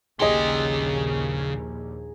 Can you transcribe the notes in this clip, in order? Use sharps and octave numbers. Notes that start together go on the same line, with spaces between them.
A#1 D#2 C#3 G4 G#4 D#5 A#5 C6